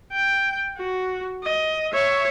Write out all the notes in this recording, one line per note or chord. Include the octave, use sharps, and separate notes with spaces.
G5
F#4
D#5
C#5 E5